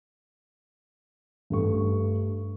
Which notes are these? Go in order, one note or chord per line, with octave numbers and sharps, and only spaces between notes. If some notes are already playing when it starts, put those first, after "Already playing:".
G2 A3 C#6